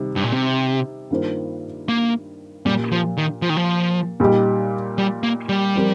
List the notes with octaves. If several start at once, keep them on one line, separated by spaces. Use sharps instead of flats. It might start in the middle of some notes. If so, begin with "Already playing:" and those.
Already playing: C3 D#3 G3
G2
A#2
C3
G2 D#3 A#3 F4 C5
A#3
A#2 G3 A#3 G4
F3
D#3
F3
D#3
F3
A#2 G3 D#4 G4
G3
A#3
G3
F3 C4 G4 A#4